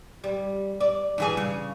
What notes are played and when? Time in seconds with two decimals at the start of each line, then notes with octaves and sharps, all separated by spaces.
0.24 G3
0.80 D5
1.18 G2 E3 G#4
1.37 C#3